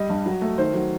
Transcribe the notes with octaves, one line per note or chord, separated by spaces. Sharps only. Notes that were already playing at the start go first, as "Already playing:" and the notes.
Already playing: G3 D#5
G2
F#3
A3
D#3 C5
F#3